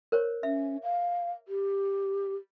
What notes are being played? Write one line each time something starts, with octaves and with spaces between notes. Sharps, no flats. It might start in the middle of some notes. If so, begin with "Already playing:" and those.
A#4 C5 C#5
C#4 E5
F5
G4